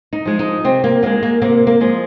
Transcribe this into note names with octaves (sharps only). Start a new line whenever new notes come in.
D#4
F3 G#3
D#4
C3 C4
A#3
F3 G#3 A#3
A#3
C3 A#3
A#3
F3 G#3